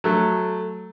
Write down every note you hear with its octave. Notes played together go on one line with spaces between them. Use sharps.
F#3 A3